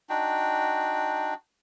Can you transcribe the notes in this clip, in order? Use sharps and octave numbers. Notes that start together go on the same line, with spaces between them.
D4 D#4 F#4 G5